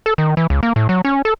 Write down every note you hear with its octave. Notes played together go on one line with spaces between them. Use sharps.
A4
D#3
E3
C#2
A#3
A2
F#3
C#4
A4